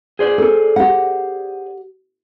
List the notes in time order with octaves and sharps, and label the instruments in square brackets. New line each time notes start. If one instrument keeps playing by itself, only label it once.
[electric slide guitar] G#4 C5 D5
[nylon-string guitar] A4 A#4
G4 F#5